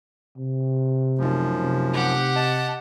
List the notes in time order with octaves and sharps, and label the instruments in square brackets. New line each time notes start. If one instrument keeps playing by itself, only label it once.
[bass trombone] C3
[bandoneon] F#2 F3 [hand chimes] A3 D#4
[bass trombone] C3
[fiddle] G4 F#5
[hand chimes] D#5 [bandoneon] A5